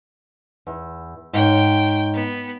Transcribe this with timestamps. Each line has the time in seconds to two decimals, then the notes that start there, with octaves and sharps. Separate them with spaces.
0.67 E2
1.33 G#2 C#5 G5
2.14 B3